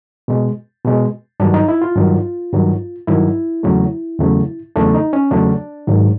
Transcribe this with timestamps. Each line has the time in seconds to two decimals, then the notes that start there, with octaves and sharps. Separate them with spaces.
0.28 B2 G#3
0.85 B2 G#3
1.40 G2 D#3 F#3 D4
1.54 D#4
1.68 E4
1.82 F4
1.96 G2 D#3 F#3
2.53 G2 D#3 F#3
3.07 G2 D#3 F#3 E4
3.63 E2 C#3 F#3 A3
4.19 E2 C#3 F#3 A3
4.76 E2 C#3 F#3 A3 D4
4.94 D#4
5.13 C#4
5.31 E2 C#3 F#3 A3 D4
5.87 G#2 D#3 F#3